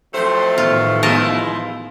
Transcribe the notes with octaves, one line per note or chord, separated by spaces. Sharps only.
F2 C3 F#3 A3 C5
A1 D#3 B3 F4
F3 G#3 E4 A#4 D#5 A5